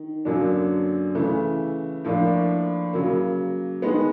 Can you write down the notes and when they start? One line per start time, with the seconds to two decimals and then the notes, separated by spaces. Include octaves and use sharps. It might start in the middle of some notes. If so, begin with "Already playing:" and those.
Already playing: D#3
0.25 F#2 D3 F#3 A#3 D4
1.15 C#3 E3 A3
2.04 A2 F3 A#3 D4
2.93 C#3 F#3 A#3
3.82 D#3 G#3 B3